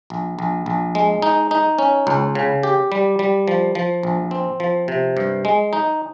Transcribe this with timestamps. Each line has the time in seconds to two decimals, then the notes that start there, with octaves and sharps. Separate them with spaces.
0.10 A#1
0.39 A#1
0.66 A#1
0.95 G#3
1.22 D#4
1.51 D#4
1.79 C#4
2.07 C#2
2.35 C#3
2.63 G4
2.92 G3
3.19 G3
3.48 F3
3.75 F3
4.03 A#1
4.31 C4
4.60 F3
4.88 C3
5.17 G2
5.45 G#3
5.73 D#4